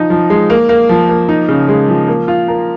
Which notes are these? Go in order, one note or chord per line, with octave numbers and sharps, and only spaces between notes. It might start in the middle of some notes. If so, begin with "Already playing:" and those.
Already playing: F3 D#4
F3
G#3
A#3
A#3
F3
A#3
D#4
C#3
G#3
F3
A#3
F4
A#4